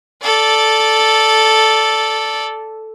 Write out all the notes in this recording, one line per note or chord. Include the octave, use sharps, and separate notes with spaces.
A4 D5